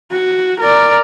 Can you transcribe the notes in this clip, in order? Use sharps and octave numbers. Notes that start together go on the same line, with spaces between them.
F#4
A#4 D5